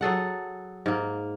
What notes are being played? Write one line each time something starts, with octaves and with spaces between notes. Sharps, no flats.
F#3 G#4 A4 F#5
G#2 A#3